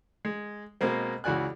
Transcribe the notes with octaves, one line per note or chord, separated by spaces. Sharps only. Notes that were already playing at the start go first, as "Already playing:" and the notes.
G#3
B2 G#3 A#3 C4
C#2 E3 F#4 D5 G#5 F#6